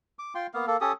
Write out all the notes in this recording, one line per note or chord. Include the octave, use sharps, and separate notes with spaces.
D6
F4 G5 C6
A#3 B3 F5
A#3 A4
C#4 G4 A4 D#6